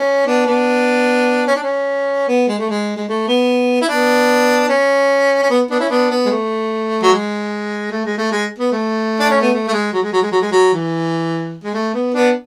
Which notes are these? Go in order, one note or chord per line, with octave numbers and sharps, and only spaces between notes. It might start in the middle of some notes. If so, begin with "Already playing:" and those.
Already playing: C#4
B3 D4
B3 D4
C#4
D4
C#4
B3
G#3
A3
G#3
G#3
A3
B3
E4
B3 D4
C#4
C#4
B3
B3 D4
C#4 E4
B3 D4
B3
G#3
A3
F#3
G#3
A3
G#3
A3
G#3
B3
A3
D4
C#4
B3
A3
A3
G#3
F#3
G#3
F#3
G#3
F#3
G#3
F#3
E3
G#3
A3
B3
B3 D4